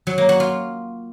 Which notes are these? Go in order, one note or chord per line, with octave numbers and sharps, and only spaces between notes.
F#3
A#3
F#4
F4